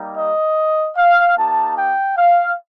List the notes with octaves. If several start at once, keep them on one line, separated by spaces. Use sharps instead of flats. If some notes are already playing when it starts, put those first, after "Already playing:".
Already playing: G3 A#3 D#4 G4
D#5
F5
A#3 D#4 G4 A5
G5
F5